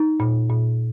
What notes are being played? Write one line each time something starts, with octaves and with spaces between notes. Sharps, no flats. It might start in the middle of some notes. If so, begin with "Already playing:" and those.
Already playing: D#4
A#2
A#2